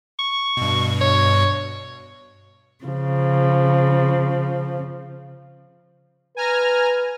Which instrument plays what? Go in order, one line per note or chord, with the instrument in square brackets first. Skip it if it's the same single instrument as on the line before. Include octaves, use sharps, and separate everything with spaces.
[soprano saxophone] C#6
[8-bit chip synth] G2 B2
[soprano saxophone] C#5
[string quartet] C#3 F3
[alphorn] B4 [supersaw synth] G#5 A#5 F6